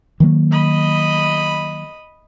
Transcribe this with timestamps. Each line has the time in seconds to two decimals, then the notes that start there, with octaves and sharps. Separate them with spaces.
0.20 D#3 F#3 A#3
0.52 D#5 B5